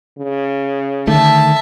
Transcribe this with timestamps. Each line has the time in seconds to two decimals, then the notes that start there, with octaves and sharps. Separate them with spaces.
0.18 C#3
1.07 D3 D#3 A3 E5 A5